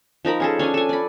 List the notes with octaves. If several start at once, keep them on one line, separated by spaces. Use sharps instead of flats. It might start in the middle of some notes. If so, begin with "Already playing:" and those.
F3 D#4 A#4 B5
C#4 G#4 A4
C#4 D4 C#5 G#5
A4 G#5
D5 B5